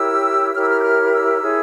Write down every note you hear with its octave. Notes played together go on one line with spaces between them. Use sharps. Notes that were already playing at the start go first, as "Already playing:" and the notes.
Already playing: E4 G4 A#4 C#5 E6
E4 G4 A#4 C#5 F6
E6
F6
G6
F6
E6
E4 G#4 C#5